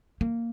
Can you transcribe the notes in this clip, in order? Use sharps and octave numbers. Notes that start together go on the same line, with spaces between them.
A#3